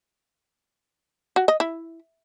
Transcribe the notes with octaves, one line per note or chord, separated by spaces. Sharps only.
F#4
D#5
E4